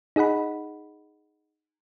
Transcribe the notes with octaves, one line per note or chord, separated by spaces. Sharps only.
D#4 G#4 D#5 F#5 B5